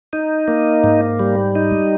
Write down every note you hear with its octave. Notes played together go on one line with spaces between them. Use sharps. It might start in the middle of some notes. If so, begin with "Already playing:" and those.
D#4
A#3
G#2
G3
D#4